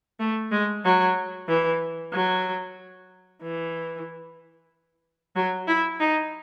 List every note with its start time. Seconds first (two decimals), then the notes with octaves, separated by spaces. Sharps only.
0.20 A3
0.51 G#3
0.84 F#3
1.48 E3
2.13 F#3
3.42 E3
5.35 F#3
5.68 E4
6.00 D#4